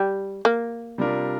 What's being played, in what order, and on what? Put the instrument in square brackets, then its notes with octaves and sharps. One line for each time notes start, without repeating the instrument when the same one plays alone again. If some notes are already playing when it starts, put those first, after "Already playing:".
Already playing: [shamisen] G3
A#3
[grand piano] C3 G3 D4 F4 A#4